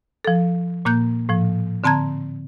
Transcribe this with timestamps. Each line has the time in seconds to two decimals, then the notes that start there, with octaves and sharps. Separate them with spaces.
0.25 F3 A4
0.85 A#2 A#3 F#6 G6
1.29 A2 F3
1.84 D3 C4 A5 A#5 G#6